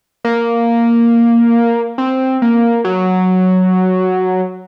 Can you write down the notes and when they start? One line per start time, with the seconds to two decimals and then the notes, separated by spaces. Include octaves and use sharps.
0.24 A#3
1.98 C4
2.42 A#3
2.84 F#3